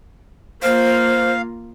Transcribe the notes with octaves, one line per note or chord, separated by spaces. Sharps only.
A#3 F4 C5 F5